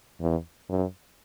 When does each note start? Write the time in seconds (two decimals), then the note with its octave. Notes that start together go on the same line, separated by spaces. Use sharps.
0.21 E2
0.69 F#2